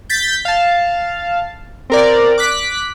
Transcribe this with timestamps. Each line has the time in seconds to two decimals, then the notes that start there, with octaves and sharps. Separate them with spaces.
0.09 G6 A6 B6
0.45 F5 A5
1.90 C4 A#4 D5
2.38 D6 F#6 B6